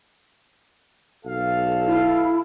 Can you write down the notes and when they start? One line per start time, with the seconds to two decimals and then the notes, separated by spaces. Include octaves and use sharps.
1.25 B1 A4 F5
1.86 E4